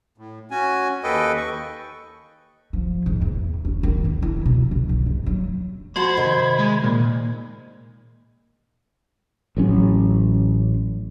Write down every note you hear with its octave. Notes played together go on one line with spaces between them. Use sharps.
A2
C#4 F#4 G#5
D#2 A4 B4 D#5 G5
C#6
F3
G#2
E2
C#4
D#3
E2
E4
B2
D3
B1
G#2
F#3
F#4 C5 F#5 A5 B5 G#6
C3 D#3 D#5
G#3
A#2
A1 F#3 C#4